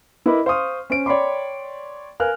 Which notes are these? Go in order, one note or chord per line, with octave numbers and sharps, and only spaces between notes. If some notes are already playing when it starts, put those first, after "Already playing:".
E4 A#4 B4 D#5 B5 D6
C5 F5 C6 C#6 D#6 F6
C#4 C5 D7
C#5 D5 G5 B5 C6 D6
A#4 B4 F5 G#5 F6 F#6